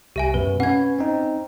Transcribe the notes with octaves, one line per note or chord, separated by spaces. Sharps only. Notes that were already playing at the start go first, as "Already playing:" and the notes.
C2 G4 E5 G#5
F#2 B2 B4
C#4 B4 F#5 G#6
C4 D#4